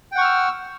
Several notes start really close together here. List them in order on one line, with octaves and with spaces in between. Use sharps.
G5 F#5 C#6 F6 E6